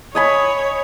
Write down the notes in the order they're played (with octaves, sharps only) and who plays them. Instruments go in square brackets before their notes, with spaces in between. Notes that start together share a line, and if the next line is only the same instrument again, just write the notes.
[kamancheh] C#5 [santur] D#5 G#5 B5